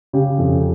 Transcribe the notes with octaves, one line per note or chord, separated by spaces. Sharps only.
C#3 G4
F2